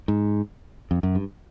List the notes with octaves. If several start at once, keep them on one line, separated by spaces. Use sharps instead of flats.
G#2
F2
F#2
G2